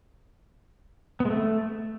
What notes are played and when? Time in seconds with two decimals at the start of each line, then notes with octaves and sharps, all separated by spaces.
1.20 B3
1.25 G#3
1.30 A3